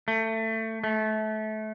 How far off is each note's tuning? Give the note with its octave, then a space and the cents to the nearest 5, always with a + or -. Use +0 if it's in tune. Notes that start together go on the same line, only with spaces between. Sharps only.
A3 +20
A3 -25